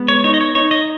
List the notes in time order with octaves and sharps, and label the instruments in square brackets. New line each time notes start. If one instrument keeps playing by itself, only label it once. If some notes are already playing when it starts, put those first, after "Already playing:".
Already playing: [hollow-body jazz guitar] G#3 B3
[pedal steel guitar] C#5
[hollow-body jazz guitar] D#4 [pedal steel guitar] C#5
[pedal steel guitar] D#5
C#5
[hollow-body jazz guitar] D#4 [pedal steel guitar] C#5
[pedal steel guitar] D#5